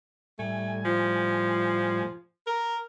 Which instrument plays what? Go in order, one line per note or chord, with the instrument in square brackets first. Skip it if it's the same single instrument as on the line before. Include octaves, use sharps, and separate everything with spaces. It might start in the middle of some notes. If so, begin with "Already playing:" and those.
[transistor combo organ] A2 G3 G#5 [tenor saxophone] A3
[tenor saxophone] F3
A#4